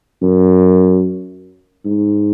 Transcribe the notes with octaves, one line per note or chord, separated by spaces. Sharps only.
F#2
G#2